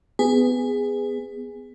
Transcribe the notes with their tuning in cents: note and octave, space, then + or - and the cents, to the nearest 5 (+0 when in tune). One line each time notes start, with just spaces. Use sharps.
B3 +15 G#4 -10